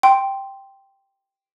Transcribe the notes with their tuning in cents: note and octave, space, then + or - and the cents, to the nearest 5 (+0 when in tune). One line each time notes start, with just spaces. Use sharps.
G5 +0 C6 +0